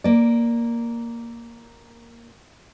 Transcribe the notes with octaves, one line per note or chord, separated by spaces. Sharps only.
A#3 D5